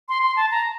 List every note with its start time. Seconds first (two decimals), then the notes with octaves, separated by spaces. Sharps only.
0.09 C6
0.23 C6
0.36 A5
0.51 A#5